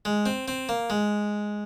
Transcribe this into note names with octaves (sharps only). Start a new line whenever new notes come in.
G#3
C4
C4
A#3
G#3